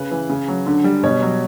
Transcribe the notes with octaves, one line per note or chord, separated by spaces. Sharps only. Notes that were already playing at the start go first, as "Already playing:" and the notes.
Already playing: C#3 B4
E3
C#3
F#3
D3
G3
B2 C#5
F#3